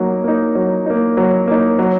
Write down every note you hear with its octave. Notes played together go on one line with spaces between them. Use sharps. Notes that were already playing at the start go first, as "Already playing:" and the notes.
Already playing: F#3 A#3 D#4
A#3 D#4
F#3
A#3 D#4
F#3
A#3 D#4
F#3